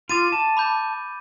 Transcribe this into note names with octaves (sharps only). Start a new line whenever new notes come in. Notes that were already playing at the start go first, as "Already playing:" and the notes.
F4 D6 A6 D#7
A5
B5 D6 G6